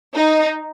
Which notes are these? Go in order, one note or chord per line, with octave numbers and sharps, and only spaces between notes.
D#4